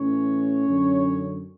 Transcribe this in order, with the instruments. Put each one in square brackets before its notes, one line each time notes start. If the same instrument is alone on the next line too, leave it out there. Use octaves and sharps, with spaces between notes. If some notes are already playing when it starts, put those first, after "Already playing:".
Already playing: [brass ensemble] A2 E3 C#4 C#5
F#2 D3